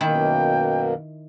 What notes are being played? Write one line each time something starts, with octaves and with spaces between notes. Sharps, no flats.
F#2 B2 D#3 A#3 E4 G5